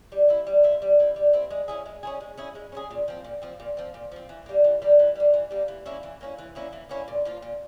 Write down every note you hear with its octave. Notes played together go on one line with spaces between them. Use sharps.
G3
C4 E4
G3
C4 E4
G3
C4 E4
G3
C4 E4
G#3
C#4 E4 G#4
G#3
C#4 E4 G#4
G#3
C#4 E4 G#4
G#3
C#4 E4 G#4
A#2
F3 C4
A#2
F3 C4
A#2
F3 C4
A#2
F3 C4
E3
G3 A#3
E3
G3 A#3
E3
G3 A#3
E3
G3 A#3
E3
A#3 C#4 E4
E3
A#3 C#4 E4
E3
A#3 C#4 E4
E3
A#3 C#4 E4
A#2
F3 A#3 F4
A#2